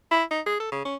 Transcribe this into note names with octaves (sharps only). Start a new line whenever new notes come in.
E4
D#4
G#4
A4
C#3
C#4